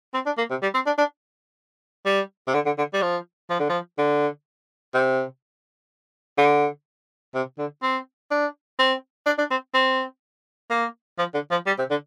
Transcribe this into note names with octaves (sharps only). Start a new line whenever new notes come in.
C4
D4
A#3
C3
G3
C4
D4
D4
G3
C3
D3
D3
D3
G3
F3
F3
D3
F3
D3
C3
D3
C3
D3
C4
D4
C4
D4
D4
C4
C4
A#3
F3
D3
F3
G3
C3
D3